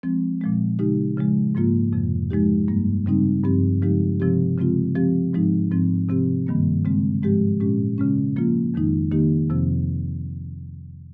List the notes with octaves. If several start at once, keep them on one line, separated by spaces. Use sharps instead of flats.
F3 G#3 C4
A#2 F3 G#3
C#3 G#3 D#4 G4
C#3 F3 G#3
G#2 F3 A#3 F4
F2 C3 F3
F3 G#3 D#4 G4
G2 G3 A#3
C#3 G3 C4 D#4
G2 F3 C4 G4
C#3 F3 G#3 D#4 G4
C3 F3 C4 G4
C#3 F3 G#3 C4 F4
F3 C4 G4
G#2 F3 G#3 D#4
G#2 F3 C4
C3 F3 C4 G4
G2 D#3 G3 A#3
C#3 G#3 C4
G#2 F3 G#3 C4 G4
A#2 G#3 C#4 G4
C#3 G#3 C#4
F3 A#3 F4
F2 D#3 G#3 D#4
D#3 A#3 D#4 G4
F2 C3 F3 C4